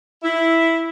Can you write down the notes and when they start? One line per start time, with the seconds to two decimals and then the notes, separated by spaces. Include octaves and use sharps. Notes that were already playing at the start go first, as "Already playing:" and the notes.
0.22 E4